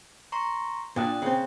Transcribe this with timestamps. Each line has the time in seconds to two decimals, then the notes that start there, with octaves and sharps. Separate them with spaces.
0.32 A#5 C6 C#6
0.96 A#2 D4 G5 D#6 F#6
1.22 C#3 C4